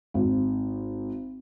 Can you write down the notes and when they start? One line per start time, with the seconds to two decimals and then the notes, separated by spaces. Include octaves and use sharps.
0.14 G#1